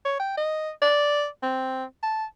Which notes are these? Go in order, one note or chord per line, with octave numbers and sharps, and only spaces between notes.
C#5
G5
D#5
D5
C4
A5